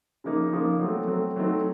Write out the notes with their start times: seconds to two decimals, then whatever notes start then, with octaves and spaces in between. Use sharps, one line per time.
0.24 C#3 F3 A#3 D#4
0.52 C#3 F3 A#3 D#4
0.80 F#3 A3 C4
1.07 F#3 A3 C4
1.36 F#3 A3 C4 D#4